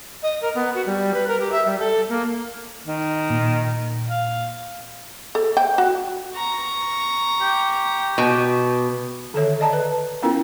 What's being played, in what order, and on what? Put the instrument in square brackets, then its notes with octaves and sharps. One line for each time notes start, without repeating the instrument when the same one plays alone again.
[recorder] D#5
A#4
B3
F#4
G3
B4
A#4
G4
E5
G3
A4
A#3
[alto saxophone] D#3
[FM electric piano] A#2
[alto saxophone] F5
[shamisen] A4
G5
F#4
[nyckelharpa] A#5 C#6
[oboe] G4
[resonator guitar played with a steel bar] B2
[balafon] D3 D#3 A4 C#5 E5
D5 D#5 A5 A#5
B4
B3 C#4 E4 F4 A#4 G5